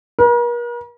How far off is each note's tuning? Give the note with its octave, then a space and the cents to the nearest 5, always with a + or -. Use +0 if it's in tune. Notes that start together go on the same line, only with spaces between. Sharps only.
A#4 +45